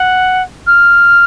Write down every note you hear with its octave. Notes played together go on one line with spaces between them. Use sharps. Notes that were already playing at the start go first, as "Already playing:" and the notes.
Already playing: F#5
F6